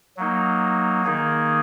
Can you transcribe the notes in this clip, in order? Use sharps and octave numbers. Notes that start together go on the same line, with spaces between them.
F#3 A#3 D#4
D#3 A#3 D#4 G#4